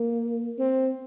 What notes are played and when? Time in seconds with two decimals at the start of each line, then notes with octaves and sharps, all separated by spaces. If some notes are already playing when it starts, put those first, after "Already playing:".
Already playing: A#3
0.59 C4